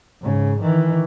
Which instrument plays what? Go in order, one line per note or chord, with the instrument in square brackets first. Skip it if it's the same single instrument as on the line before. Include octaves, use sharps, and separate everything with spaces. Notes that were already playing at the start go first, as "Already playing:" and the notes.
[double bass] G#2 C#3
D#3 E3